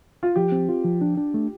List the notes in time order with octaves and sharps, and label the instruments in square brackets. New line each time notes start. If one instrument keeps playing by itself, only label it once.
[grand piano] F4
[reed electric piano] F3 [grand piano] G4
[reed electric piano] C4
F4
F3
D4
D4
A3